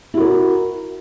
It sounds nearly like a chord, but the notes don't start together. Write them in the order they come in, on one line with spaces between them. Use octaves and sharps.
E4 F#4 A#4